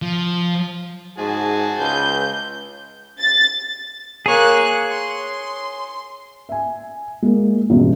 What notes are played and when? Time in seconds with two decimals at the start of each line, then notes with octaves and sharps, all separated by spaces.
0.02 F3
1.18 G#2 F#4 G#4 A5
1.80 C#2 G6
3.20 A6
4.26 A#3 G#4 C#5 F#6
4.92 C6
6.49 E5 G#5
7.22 G#3 A#3
7.70 A1 E2 G2 B2